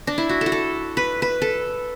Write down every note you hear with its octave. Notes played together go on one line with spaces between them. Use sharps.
D4
E4
F#4
A4
F#4
A4
B4
B4
A4